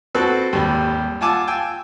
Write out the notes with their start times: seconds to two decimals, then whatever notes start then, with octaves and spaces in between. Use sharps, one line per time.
0.15 C4 F#4 A4 B4
0.53 G#1 D#2 G3
1.21 F4 F#5 G#5 A5 D6 E6
1.47 G5 G#5 E6